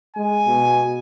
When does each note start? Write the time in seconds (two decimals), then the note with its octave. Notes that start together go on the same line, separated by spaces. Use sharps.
0.16 G#3 G#5
0.46 B2